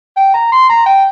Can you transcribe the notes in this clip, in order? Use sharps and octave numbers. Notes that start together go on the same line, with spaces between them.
G5
A#5
C6
A#5
G5